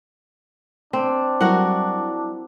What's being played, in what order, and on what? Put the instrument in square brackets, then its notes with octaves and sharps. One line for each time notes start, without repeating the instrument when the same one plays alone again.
[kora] C4 [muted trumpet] D4
[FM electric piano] F#3 G3 E4 [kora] F#4 A#4 F#5